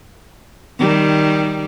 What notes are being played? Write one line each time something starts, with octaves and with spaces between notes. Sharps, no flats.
D#3 G3